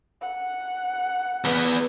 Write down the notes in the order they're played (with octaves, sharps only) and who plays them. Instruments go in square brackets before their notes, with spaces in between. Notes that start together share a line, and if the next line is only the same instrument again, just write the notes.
[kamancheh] F#5
[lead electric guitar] E2 B3